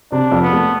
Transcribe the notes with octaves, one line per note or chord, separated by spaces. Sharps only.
C3 D4
F2
B3
A3